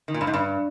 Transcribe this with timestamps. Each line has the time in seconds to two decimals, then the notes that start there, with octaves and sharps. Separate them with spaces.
0.08 D#3
0.14 A#2
0.21 G2
0.27 G#2
0.34 G2